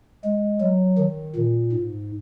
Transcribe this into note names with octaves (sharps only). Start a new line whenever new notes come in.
G#3
F#3
D#3
A#2
G#2